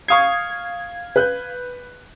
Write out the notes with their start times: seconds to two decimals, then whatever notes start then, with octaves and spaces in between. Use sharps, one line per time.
0.08 F5 C#6 D#6 G#6 C7
1.16 B4 F#6 G6